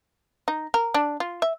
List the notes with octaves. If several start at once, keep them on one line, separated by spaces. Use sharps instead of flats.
D#4
A#4
D4
F4
E5